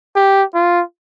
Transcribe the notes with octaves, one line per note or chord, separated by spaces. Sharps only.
G4
F4